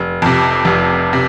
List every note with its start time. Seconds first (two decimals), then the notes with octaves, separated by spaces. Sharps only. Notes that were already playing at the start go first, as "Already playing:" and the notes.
Already playing: F1
0.22 F2 C3
0.65 F1
1.13 C3